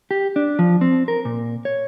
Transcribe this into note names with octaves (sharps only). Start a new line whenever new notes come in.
G4
D4
F3
C4
A#4
A#2
C#5